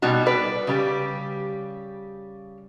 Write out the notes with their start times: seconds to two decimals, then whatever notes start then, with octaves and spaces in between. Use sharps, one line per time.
0.02 B2 G3 D#4 F#4
0.26 B4 D5
0.67 C#3 G3 G4